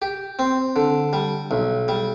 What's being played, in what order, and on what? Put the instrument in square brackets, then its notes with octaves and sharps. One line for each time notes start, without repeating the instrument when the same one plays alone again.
[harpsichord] G4
C4
D3
G3
B1
G3